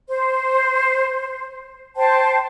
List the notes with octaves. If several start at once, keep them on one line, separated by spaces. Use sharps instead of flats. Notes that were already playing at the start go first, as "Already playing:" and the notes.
C5
C5 G5 A5